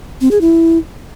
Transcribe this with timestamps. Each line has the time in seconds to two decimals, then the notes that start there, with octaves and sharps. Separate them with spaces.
0.21 C4
0.31 G#4
0.41 E4